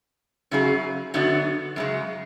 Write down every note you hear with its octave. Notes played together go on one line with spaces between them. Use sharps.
F#2 C#3 F#3 C#4 G#4
F#2 D3 F#3 B3 D4
F#2 C#3 G#3